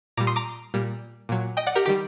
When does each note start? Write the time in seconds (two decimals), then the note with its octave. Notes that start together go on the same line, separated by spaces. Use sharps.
0.17 A#2 G3 A#5 D6
0.27 C6 D#6
0.36 A#5 D6
0.74 A#2 G3
1.29 A#2 F#3
1.57 D#5 G5
1.67 D5 F#5
1.75 G4 A#4
1.86 D#3 G3 G4